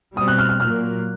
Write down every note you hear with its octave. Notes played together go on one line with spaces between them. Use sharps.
B2 G3 C4 D#6
F#6
F6
F6
A#2 F#3 A#3 F6